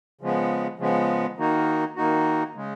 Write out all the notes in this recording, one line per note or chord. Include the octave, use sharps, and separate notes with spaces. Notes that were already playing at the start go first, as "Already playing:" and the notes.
C#3 F3 G#3 B3
C#3 F3 G#3 B3
D#3 A#3 D#4 F#4
D#3 A#3 D#4 F#4
C#3 G#3